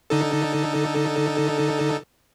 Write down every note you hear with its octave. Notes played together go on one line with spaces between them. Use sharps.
D3 D#4 A4